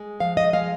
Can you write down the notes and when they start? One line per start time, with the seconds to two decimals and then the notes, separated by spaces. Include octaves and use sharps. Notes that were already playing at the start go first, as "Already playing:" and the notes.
Already playing: G#3
0.20 F3 F5
0.37 D#5
0.53 G#3 F5